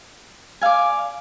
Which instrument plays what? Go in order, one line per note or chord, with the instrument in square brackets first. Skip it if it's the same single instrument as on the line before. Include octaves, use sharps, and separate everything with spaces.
[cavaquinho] D5 F5 G#5